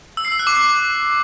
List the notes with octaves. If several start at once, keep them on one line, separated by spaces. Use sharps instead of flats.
E6
C7
E6
F#6
D6